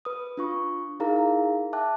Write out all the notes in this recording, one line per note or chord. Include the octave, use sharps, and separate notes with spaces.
B4 D#6
D4 F4 C#6
D#4 E4 G#4 A#4 F5 A#5
E5 G5 A5 D6 F#6